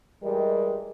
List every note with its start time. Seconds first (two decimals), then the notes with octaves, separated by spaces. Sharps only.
0.23 E3 G3 G#3 G4 A#4 D#5